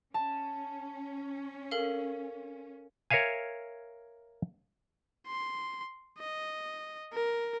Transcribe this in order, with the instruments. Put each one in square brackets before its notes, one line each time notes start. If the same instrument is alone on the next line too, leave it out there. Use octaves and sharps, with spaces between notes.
[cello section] C#4 [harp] A5
[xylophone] A4 A#4 F5
[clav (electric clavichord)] A#4 C#5 E5 F5 G#5
[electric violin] C6
D#5
A#4